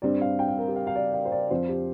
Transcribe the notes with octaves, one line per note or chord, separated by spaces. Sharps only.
G2 G3 C4 D5
F5
G5
F5
A#4
G4
F5
F5
D5
F5
C5
D5
F2 F3 C4 C5
G4